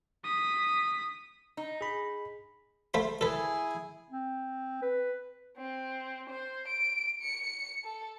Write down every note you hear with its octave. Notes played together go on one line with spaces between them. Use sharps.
D#6 B6
D#4
G#4 B5
A3 C5 B5
E4 G#4 A4 B4 G#5
C4
B4
C4
C5
D7
C#7
A4